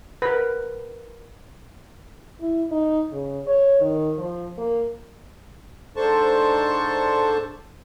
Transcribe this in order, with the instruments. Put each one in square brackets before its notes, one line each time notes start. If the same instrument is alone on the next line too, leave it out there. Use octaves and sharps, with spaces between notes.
[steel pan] A#4 B4
[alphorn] E4
D#4
C#3
C#5
D#3
F3
A#3
[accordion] G#2 D4 A4 C5 A5 C#6